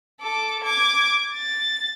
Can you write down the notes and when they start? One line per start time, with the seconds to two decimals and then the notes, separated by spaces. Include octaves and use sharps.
0.20 A4 D6
0.63 D6 G#6
1.34 A6